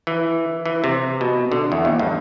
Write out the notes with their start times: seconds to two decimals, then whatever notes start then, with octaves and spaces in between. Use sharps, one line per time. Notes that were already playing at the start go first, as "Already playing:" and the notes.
0.07 E3
0.66 E3
0.84 C3
1.21 B2
1.52 D3
1.72 E2
1.85 D#2
1.99 G2